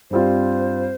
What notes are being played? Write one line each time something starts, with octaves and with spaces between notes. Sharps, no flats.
G2 G3 C4 F4 C5